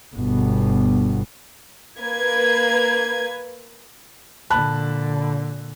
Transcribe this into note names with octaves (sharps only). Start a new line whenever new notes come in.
G1 B2
A#3 B4 G#6
A#2 D3 A5 B5 F#6